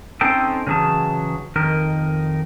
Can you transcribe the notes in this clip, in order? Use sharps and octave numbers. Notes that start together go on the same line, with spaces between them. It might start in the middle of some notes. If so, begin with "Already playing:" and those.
C4 C#4 D#4 A4 C5 G5
C#3 E3 F#3 G#4 A5
F2 D#3 D#4 A#4